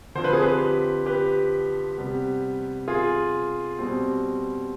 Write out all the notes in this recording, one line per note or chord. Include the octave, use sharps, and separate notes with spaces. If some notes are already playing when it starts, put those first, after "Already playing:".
D3 F3 C4 C5
B4
G#4
G4 B4
G4 B4
C3 G3 B3
F4 G#4
B2 G3 C4